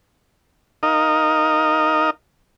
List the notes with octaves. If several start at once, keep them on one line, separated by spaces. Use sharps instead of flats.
D#4 A#4 D#5 F5